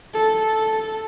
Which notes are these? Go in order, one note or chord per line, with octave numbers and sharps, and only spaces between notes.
A4
A4